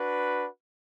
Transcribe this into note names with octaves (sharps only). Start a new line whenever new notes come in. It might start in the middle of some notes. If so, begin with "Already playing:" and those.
Already playing: D4 F#4 B4